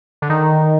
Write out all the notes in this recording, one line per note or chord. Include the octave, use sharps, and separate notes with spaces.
D3
D#3